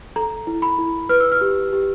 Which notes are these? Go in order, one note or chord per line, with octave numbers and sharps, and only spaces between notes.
A4 A#5
E4
B5
E4
B4 F6
E6
F6
G4
G4